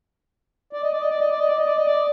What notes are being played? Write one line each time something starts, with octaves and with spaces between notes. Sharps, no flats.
D5
D#5
D5
D#5
D5
D#5
D5
D#5
D5
D#5
D5
D#5
D5